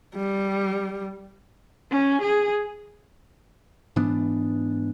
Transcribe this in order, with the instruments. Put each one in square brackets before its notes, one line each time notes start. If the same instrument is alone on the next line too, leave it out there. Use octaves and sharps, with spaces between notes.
[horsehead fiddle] G3
C#4
G#4
[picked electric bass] G#2 E3 B3 D4